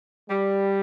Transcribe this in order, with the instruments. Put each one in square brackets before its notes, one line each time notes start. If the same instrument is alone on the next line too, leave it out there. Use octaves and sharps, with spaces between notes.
[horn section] G3